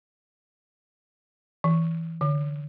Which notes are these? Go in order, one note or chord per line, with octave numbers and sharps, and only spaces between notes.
E3
D3